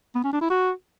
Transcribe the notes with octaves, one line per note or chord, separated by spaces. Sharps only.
B3
C#4
D4
E4
F#4